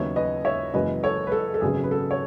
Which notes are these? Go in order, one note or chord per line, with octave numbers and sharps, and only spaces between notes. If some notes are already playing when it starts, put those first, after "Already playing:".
Already playing: D#2 C#3 F#3 B3 D#4 C#5 E5
B4 D#5
C#5 E5
F#1 F#2 E3 G#3 B4 D#5
A4 C#5
B4
A4
A4
G#1 F#2 C#3 F#3 B3 G#4
B4
A4
C#5